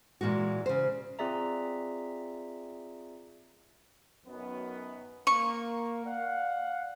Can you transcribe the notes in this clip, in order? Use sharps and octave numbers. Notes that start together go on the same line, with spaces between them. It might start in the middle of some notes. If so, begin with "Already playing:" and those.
A#2 E3 G#3 F#4
C#3 C5
C4 F4 G#4 D5 E5 A#5
F#2 D#3 B3
A#3 C#6
D5 F5 F#5